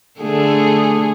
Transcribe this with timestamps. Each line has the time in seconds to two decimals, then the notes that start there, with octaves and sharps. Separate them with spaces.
0.20 D3 A3 G#4